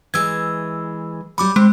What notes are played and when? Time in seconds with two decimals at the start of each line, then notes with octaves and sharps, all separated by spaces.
0.14 E3 G#3 E6 G#6
1.38 F#3 G3 B5 D6
1.56 G#3 C4